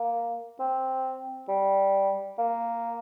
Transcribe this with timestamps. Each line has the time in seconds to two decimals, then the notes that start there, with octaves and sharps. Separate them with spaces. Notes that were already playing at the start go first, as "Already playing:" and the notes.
Already playing: A#3
0.59 C4
1.49 G3
2.38 A#3